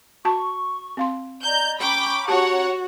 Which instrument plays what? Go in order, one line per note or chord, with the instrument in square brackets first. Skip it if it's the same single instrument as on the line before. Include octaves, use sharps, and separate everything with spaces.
[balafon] F#4 A5 [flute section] C#6
[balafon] C4 F5 C6
[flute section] D5 D#5 A#5 [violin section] G6
[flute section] C#4 A#5 C#6 [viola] G5 [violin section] B5 D6
[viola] F#4 [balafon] G4 A5 [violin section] C#5 F#5